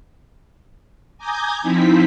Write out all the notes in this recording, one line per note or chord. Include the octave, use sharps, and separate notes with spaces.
G#5 A#5 D6 D#6 G6 G#6
F3 C4 D#4 E4 B6